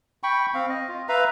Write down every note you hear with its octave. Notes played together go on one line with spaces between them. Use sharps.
G5 B5 C#6
C4 F5
D#5
F4
B4 E5 F5 A#5